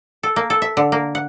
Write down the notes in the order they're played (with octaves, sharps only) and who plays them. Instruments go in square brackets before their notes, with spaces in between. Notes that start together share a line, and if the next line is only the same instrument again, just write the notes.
[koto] A4
A#3
A4
E5
D3
A#3
F#5